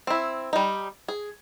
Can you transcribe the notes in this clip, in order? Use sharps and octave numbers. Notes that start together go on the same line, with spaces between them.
C4 E4
G3 D#4
G#4